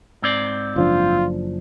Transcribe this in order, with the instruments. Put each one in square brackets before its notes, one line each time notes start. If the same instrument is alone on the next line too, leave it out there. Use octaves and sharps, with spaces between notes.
[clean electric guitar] G#2 C4 D5
[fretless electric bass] F#1 F3 D4 [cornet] F4